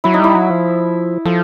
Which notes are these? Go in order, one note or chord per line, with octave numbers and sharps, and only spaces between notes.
F#3 E4
D#4
G3 E4
F#3
F3
F3 A4